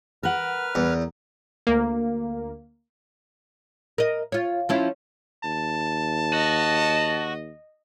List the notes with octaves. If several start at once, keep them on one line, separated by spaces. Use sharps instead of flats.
A#4 B4 F#5 F6
E2
D2 A#3
A#4 D#5
F4 C#5
F3 C#4 E4
D#2 A5
F#4 D#5